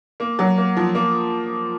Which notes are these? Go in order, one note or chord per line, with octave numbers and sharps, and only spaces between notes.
A#3
F#3
A#3
F3
A#3